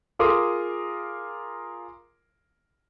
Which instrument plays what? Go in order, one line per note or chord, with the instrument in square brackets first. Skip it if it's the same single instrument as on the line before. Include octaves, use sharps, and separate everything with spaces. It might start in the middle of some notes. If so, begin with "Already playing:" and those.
[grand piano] F4 G#4 A#4 C6 D6 D#6